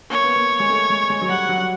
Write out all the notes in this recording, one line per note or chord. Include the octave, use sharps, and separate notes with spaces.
A#3 C#5
B3
A#3
G#3
A3
G#3
G#3
F#3
G3 F#5
F#3